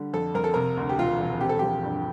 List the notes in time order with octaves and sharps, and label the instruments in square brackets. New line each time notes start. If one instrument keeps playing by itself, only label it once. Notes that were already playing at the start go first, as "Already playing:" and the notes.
Already playing: [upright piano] D3 G3
[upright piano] F2 [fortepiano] A4
[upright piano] F2 [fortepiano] A#4
[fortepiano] A4
[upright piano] C3 [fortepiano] A#4
[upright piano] D2
[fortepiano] G4
[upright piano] E1 [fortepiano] F4
[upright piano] E1
[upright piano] C4 [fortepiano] G4
[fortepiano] A4
[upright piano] F3 [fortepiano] G4
[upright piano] G2